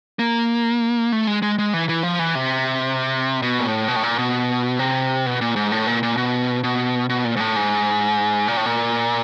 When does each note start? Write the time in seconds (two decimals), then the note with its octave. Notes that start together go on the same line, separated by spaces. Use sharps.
0.19 A#3
1.12 A3
1.27 G#3
1.42 G#3
1.58 G#3
1.74 E3
1.89 E3
2.03 F3
2.19 E3
2.35 C3
3.42 B2
3.60 A#2
3.65 A2
3.88 B2
3.96 A2
4.03 A#2
4.18 B2
4.79 C3
5.26 B2
5.41 A#2
5.56 G#2
5.72 A2
5.87 A#2
6.03 A#2
6.17 B2
6.63 B2
7.09 B2
7.25 A#2
7.36 G#2
7.40 A2
7.56 G#2
8.48 A#2
8.57 A2
8.65 A#2